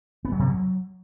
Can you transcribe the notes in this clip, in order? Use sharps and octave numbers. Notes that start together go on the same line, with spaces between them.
B3
F#3
C3
F#3